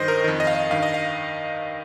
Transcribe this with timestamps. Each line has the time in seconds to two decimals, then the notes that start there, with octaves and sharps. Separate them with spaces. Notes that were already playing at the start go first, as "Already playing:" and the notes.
Already playing: G2 D#3 C5 D#5
0.08 A#4
0.24 F2 D#3
0.40 D#5
0.47 F5
0.55 D#5
0.71 G2 D#3 F5
0.83 D#5
0.94 F5